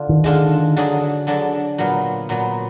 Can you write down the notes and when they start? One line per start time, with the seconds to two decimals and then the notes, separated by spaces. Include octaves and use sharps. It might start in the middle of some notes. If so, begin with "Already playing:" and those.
Already playing: D3 D4 F4
0.09 D#3
0.24 D3 G#3 D4 F4
0.77 D3 F#3 D4 G#4 D5
1.27 D3 F#3 D4 G#4 D5
1.78 A#2 F#3 B3
2.29 A#2 F#3 B3